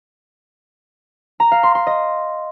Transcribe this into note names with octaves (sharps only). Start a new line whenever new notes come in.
A#5
F5
C6
C6
D#5